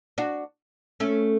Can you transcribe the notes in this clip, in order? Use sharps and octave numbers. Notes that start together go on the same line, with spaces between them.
D4 F#4
A3 C#4